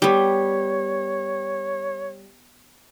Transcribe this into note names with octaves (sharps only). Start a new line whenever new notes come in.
G3 B3 G4 C#5